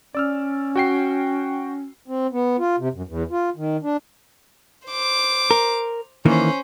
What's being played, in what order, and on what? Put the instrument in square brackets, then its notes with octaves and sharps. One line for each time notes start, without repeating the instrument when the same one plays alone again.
[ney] C#4 [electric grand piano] D5 E6 F6
[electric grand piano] F#4 G5 C7
[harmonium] C4
B3
F4
C3
F#2
E2
F4
D#3
D4
[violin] C5 D6
[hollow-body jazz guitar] A#4
[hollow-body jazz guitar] D#3 E3 A#3 [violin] C#4 C5